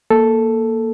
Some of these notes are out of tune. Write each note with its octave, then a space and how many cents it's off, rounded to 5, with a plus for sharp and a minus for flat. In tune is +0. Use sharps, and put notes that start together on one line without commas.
A#3 +0 A4 +0